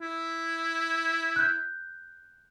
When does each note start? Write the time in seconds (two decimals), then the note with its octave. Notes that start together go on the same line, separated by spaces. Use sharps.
0.01 E4
1.36 F#6 G6